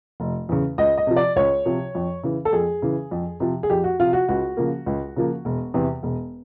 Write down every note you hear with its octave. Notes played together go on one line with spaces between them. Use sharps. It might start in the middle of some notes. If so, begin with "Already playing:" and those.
F1
E2 C#3
C#2 D#5
D#5
C3 F3
D5
C#2 C#5
C3 F3
F2
C#3 E3
A4
F2 G#4
C#3 E3
F2
C3 F3
G#4
F2 G4
F#4
C3 F3 F4
F#4
C#2 F#4
C#3 F3 A#3
C#2
C#3 F3 A#3
E1
E2 C3 E3
E1